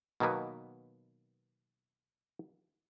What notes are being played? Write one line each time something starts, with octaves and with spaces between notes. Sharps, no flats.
B2 D#3 F#3 A#3 B3